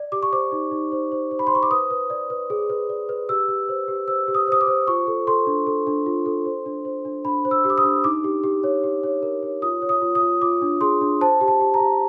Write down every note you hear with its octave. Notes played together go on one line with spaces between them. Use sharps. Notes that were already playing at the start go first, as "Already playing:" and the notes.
Already playing: D5
G4 D6
C#6
C5 D6
D#4
D#4
C5
C5
C5
B5
C6
C5 C#6
D6
B4 D#6
B4
D5
B4
G#4
B4
D5
B4
G4 E6
G4
C5
G4
C5 E6
G4
D#6
C5 D#6
D6
C5
F4 C#6
A4
A4 C6
D4
A4
D4
F4
A4
C5
D4
C5
D4
D4 B5
C5
E6
G4
D6
D#6
D4
D#4 D6
G4
G4
C#5
G4
C#5
A#4
C#5
F4 D#6
C#5
D#6
F4
D#6
F4
F4 D6
D4
G#4 C6
D4
C5 A5
G4
A5
G4
A#5
G4